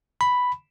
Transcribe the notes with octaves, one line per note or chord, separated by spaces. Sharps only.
B5